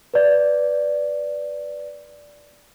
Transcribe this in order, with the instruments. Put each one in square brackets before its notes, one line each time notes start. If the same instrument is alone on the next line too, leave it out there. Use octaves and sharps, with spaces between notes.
[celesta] B4 D5